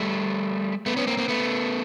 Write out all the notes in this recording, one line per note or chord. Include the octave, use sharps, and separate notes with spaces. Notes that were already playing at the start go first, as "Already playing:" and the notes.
Already playing: G3 A3
A3 B3
B3 C#4
A#3 C4
A#3 C4
A3 B3